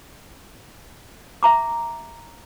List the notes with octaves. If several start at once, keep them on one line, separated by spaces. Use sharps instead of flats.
E5 A#5 D6